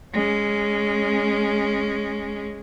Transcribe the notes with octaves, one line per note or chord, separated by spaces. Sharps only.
G#3 C#4